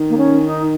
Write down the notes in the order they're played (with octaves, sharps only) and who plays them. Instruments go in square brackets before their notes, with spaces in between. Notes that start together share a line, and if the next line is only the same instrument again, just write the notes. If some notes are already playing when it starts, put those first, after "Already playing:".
Already playing: [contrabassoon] D#3
[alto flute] A#3
C#4
D#4